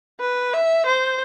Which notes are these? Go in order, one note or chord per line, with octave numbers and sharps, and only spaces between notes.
B4
E5
C5